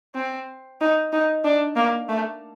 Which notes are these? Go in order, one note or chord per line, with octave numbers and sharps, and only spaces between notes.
C4
D#4
D#4
D4
A#3
A3